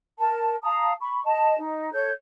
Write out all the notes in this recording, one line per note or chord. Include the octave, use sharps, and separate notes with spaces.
A#4 A5
F5 A5 A#5 D#6
B5 C#6
D#5 A5
D#4
A4 C#5 G6